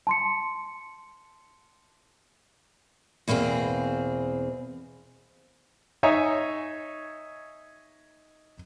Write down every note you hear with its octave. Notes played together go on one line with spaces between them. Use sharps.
A5 C6 C#7
E2 B2 A#3 C4 G#4
D#4 C#5 D#5 E5 G#5 A#5